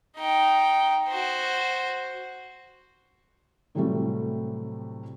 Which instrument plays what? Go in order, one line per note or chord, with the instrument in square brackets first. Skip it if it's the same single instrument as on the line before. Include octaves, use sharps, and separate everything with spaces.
[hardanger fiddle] D#4 G5
F#4 C5
[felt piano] A2 C3 E3 F#3 G3 A3